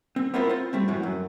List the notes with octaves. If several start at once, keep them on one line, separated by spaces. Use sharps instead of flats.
C4
B3 C4 E4 F4 A#4 C5
C4 F4
G3 A3 C4
F#2 A2 E3 F#3
F#2